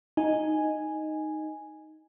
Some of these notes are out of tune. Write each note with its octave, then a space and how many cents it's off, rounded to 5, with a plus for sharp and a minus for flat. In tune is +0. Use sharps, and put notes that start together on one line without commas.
D#4 +0 G#5 +0